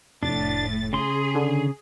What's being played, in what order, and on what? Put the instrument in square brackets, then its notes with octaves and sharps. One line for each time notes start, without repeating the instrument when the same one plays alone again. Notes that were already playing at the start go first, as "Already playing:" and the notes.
[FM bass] F1 [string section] A2 A6 [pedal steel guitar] D4
[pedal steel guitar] C#3 C6 [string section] G#4
[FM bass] D3